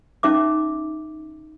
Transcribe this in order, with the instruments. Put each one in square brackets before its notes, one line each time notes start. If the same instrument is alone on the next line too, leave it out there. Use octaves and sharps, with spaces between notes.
[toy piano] C#4 D#4 E5 D6